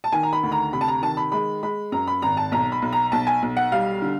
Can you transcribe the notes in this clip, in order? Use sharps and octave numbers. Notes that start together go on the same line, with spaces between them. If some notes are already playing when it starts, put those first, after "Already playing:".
A5
D#3 G#5
A#5
B5
D2
A#5
C3 B5
A5
A#5
D#3 A5
B5
G#3 B5
G#3 B5
F#2 A#5
B5
G#1 A#5
A5
B1 A#5
B5
B1
A#5
B1 A5
G#5
B1
F#5
G3 F5
D3